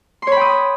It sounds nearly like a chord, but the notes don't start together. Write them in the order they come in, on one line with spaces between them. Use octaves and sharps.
C6 C#5 B5 G5 D#6